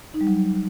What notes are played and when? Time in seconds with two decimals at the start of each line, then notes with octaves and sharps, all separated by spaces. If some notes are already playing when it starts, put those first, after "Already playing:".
0.14 D#4
0.21 G3
0.27 F#3